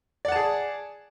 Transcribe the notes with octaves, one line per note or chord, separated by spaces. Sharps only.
G#4 D5 F#5 A5